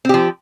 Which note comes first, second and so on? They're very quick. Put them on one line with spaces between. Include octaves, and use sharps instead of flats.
C4 G4 F3